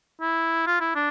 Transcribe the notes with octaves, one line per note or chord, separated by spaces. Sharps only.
E4
F4
E4
D4